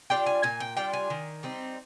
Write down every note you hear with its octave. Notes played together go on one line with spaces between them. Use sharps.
G3 D4 F4 G5
G#5
A#2 G#5
G5
G3 D4 F4 G5
G#5
D#3
G3 C4 D#4